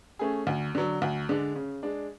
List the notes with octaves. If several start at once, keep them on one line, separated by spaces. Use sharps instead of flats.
A3 C#4 G#4
D2
D3 F#3
D2
D3 G#3 D4
C#3
G#3 D4